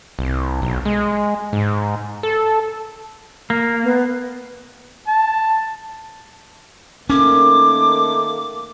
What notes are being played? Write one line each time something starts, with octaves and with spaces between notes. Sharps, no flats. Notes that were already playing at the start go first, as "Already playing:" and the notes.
C2
B1
G#3
G#2
A4
A#3
B3
A5
D#3 A3 A#3 C#4 D6